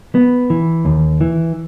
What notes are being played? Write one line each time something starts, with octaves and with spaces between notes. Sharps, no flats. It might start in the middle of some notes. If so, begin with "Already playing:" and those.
B3
E3
D#2
E3